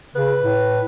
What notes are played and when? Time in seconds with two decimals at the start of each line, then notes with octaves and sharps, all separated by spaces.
0.15 C#3 B4
0.40 A2